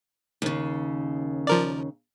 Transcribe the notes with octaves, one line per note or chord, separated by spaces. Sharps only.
D#2 C#3
F3 A#4 D5